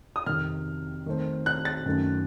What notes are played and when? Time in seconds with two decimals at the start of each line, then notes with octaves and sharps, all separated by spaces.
0.16 D#6
0.26 F2 C3 D#3 F6
1.06 D#3 A3 C4
1.46 F#6
1.65 A6
1.86 F#2 D#3 A3